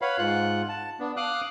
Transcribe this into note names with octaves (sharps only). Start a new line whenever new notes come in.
B4 C#5 F5 F#5 B5
G#2 F4 F#5 F#6
A5
B3 D4
F5 D6 D#6 F6 F#6